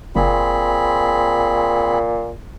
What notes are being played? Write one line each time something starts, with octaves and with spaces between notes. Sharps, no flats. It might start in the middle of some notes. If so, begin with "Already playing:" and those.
F#1 A#2 C4 G#4 B5